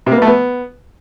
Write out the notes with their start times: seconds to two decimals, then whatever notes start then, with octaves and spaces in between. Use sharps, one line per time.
0.06 C3
0.12 A#3
0.17 B3
0.22 A3
0.27 B3